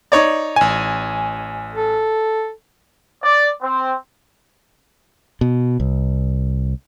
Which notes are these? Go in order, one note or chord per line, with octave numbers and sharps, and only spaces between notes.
D#4 C#5 D5
A1 G#5
A4
D5
C4
B2
C2